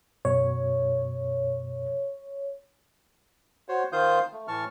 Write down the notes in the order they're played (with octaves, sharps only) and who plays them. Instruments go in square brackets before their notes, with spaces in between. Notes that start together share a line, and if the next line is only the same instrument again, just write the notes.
[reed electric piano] F#2 B2 [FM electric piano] C#5
[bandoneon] F#4 C5 C#5
D#3 F4 C5 F5 D#6 G6
A3
A2 E3 A5 C#6 F6